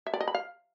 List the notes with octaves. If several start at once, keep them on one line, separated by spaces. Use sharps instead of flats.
E5
D5
D#5
B5
F5